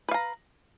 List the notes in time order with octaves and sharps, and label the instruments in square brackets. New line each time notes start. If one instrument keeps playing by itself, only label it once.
[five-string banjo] B4
F5
A#5